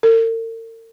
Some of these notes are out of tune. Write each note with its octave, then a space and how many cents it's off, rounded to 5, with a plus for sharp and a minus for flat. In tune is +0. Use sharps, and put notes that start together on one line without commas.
A#4 -45